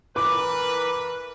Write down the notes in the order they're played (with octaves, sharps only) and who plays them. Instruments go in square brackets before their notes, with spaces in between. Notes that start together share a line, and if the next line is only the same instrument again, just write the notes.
[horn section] E3 A#4 B4 [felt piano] D6